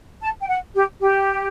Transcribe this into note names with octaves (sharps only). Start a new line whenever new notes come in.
A5
G5
F#5
G4
G4